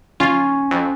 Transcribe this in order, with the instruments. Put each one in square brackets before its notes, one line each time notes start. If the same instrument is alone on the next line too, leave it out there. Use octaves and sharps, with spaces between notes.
[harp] C#4 [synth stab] F4
[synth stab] F2